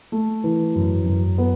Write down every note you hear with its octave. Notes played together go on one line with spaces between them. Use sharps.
A3
E3
F#2
F#2
B3